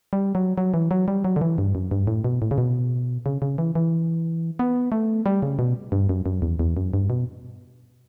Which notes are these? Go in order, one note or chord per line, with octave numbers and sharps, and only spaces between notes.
G3
F#3
F#3
E3
F#3
G3
F#3
D3
E3
G2
F#2
G2
A2
B2
A2
C#3
B2
C#3
C#3
E3
E3
B3
A3
G3
C#3
B2
G2
F#2
F#2
E2
E2
F#2
G2
B2